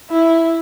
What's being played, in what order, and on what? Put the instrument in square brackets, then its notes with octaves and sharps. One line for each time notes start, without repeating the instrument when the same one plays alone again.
[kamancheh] E4